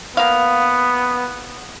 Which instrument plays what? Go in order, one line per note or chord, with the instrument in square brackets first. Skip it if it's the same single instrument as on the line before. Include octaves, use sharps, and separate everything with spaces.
[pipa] A#3 F5 [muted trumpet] B3